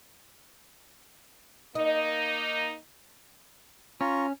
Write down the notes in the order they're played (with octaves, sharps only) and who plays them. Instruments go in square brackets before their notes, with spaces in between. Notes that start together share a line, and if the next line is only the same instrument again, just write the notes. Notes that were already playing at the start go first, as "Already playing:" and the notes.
[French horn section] A#3 D#4 [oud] D#5
[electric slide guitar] C#4 [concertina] F4 A#5 [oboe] C#6